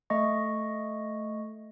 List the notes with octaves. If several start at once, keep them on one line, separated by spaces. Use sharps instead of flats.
A3 D#5 C#6